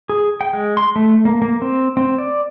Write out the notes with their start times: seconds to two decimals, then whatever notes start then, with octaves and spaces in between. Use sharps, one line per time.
0.09 G#4
0.41 G5
0.53 G#3
0.77 C6
0.96 A3
1.25 A#3
1.42 A#3
1.62 C4
1.97 C4
2.18 D5